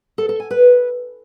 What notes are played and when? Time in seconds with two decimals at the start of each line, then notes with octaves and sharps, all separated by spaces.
0.18 A4
0.29 A4
0.40 G#5
0.51 B4